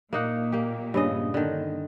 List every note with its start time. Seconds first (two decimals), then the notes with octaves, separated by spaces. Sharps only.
0.13 A#2 A#3 D#4 F#5
0.52 A#3 G4
0.94 G2 C#3 D#5
1.34 D3 D#3